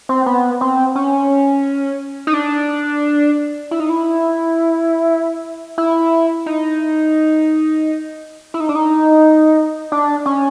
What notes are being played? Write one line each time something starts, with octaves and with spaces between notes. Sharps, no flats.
C4
B3
C4
C#4
D#4
D4
E4
D#4
E4
E4
D#4
E4
D#4
D4
D#4
D4
C#4